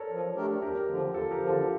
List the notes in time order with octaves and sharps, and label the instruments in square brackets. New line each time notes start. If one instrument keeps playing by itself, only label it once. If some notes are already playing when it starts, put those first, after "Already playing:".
Already playing: [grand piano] A4 A#4 C#5 D5
[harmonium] F3
A3 D4 G4 A#4
[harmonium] E2 [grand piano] G4 A#4
[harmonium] D3 F3
[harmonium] E2 [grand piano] F4 A4
[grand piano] G4 A#4
[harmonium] D3 F3
[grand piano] F4 A4